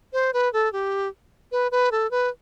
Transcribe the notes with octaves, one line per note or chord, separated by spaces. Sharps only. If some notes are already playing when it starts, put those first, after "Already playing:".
C5
B4
A4
G4
B4
B4
A4
B4